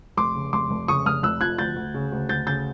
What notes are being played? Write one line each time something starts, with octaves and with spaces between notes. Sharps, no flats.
F1 C6 D6
C#3
F1 C6 D6
F1
C#3 C#6 D#6
F1 D#6 F6
F1 E6 F#6
F2 F#6 G#6
D2 G6 A6
D2
C#3
D2
D2 G6 A6
C#3 G6 A6